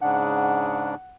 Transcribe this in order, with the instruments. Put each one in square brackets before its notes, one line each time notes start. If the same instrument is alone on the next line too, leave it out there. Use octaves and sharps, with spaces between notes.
[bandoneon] G#2 C#3 D4 [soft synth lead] F#5